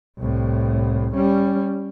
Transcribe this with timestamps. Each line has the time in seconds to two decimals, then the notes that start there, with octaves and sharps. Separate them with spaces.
0.18 C2 A2
1.15 G3 C#4